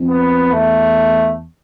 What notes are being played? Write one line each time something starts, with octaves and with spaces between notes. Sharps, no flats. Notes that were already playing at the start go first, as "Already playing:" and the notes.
Already playing: F2
B3
E2 A3